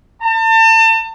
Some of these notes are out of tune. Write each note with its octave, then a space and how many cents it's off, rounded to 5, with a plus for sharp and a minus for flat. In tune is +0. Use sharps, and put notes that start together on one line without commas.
A5 +35